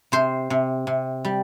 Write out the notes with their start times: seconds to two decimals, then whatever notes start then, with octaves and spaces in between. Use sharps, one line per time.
0.12 C3 C5
0.50 C3
0.87 C3
1.25 G3